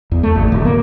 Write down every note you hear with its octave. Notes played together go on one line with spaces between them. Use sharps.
E2
A3
G#1
D1
A#3